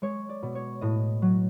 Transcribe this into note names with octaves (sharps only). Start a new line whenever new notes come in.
G#3 C#5
D5
B2
C#5
A2 D#5
F#3